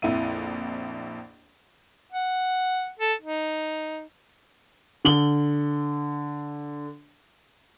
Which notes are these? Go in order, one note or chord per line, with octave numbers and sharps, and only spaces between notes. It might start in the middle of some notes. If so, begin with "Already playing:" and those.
A#1 F2 E4 E5 D#7
F#5
A4
D#4
D3 F#7 G7